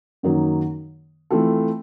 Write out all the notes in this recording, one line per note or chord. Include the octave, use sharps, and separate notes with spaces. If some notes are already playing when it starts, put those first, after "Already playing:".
F#2 D#3 F#3 A#3 D#4
E3 A3 C4 F4 A4